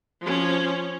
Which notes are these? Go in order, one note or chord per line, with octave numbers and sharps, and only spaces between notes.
F3 C#4